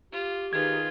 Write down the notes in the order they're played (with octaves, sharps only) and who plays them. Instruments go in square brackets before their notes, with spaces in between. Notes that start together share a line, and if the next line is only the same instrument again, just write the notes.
[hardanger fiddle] F4 [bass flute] G4
[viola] D#3 G#4 [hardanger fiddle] F4 B4 [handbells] G#6